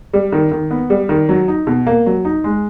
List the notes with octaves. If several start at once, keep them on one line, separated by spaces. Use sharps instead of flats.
G3
D#3
D#3
B3
G3
D#3
F#3
D#4
B2
A#3
F#3
D#4
G#3